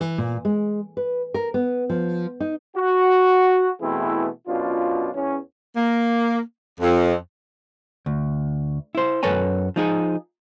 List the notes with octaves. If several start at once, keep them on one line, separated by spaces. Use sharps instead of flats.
E3
A#2
G#3
B4
A#4
B3
F3
D#4
F#4
B2 E3 A3 C4 E4 G#4
F#2 B2 D4 F4
E2 C#4
A#3
F2
D2
E4 C5
F#2 A4 B4 C#5 G#5
F3 D#4 G#4